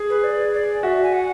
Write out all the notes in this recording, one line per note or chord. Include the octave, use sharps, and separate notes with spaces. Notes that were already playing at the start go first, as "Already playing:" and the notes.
Already playing: G#4
B4
D5
D5
F#4 E5
G#5
F#5